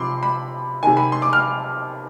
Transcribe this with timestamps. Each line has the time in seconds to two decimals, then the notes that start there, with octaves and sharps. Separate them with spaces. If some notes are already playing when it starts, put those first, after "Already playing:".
Already playing: C3 F3 B5 C6 D6
0.23 B5
0.83 C3 D#3 G#5
0.97 B5
1.12 C6
1.22 D6
1.33 F6